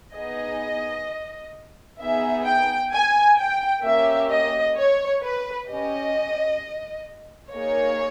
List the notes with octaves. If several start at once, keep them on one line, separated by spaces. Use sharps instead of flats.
B3 D#4 G#4 D#5
B3 D#4 G#4 E5
G5
G#5
G5
A#3 C#4 G4 E5
D#5
C#5
B4
C#4 G4 D#5
A#3 D#4 G#4 C#5